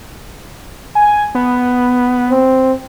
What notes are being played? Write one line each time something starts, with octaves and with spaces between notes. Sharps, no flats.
G#5
B3
C4